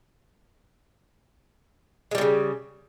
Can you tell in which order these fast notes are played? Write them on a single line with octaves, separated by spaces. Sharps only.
G#3 G3 A2 C#3